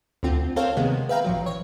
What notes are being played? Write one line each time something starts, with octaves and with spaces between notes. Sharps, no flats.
D2 D3 C4 F4
C4 A4 A#4 C5 C#5 F5
C3 D#3 G#3 A#3 B3
B4 E5 F5 G5 A#5
A1 F3 F#3
C#5